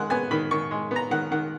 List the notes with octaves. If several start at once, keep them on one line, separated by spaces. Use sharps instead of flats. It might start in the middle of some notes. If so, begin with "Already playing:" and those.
Already playing: D#3 G#3 F#5
B3 G#5
D#3 B5
D#3 C#6
G#3
B3 A#5
D#3 F#5
D#3 F#5